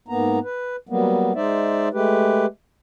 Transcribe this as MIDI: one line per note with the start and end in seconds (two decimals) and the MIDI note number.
0.08 0.39 44
0.08 0.39 58
0.08 0.39 59
0.08 0.39 82
0.43 0.76 71
0.89 1.33 54
0.89 1.33 55
0.89 1.33 58
0.89 1.33 59
1.35 1.89 56
1.35 1.89 63
1.35 1.89 72
1.35 1.89 74
1.35 1.89 76
1.93 2.46 56
1.93 2.46 57
1.93 2.46 67
1.93 2.46 71